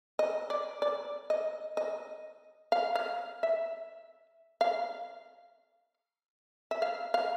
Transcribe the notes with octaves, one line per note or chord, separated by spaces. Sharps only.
D#5
D5
D5
D#5
D#5
F5
F5
E5
F5
E5
F5
F5